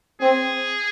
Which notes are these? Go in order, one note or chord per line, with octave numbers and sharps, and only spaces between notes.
C4 G#4